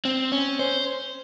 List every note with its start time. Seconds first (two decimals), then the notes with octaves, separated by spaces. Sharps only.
0.05 C4
0.32 C#4
0.59 C5